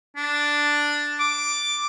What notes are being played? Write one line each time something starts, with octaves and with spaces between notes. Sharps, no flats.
D4
D6